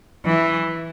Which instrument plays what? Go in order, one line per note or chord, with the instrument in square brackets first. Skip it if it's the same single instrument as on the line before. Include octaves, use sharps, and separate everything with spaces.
[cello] E3